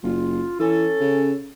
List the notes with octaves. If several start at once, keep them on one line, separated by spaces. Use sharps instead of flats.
F#1 F4
E3 C#4 A4
C#3